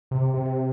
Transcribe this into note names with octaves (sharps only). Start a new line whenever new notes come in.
C3
C3